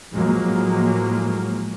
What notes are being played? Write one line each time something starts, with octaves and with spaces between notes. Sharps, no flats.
A2 F3 F#3 G#3 A#3